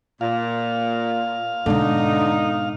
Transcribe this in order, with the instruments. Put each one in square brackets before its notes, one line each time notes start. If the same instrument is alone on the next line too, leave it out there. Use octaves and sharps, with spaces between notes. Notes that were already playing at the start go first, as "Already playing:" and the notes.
[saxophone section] A#2 [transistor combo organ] F5
[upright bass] G#2 B2 [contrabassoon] D3 [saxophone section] D#4